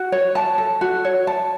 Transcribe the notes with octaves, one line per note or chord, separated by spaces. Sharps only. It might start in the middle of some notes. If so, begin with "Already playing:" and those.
Already playing: F#4
C#5
A5
A4
F#4
C#5
A5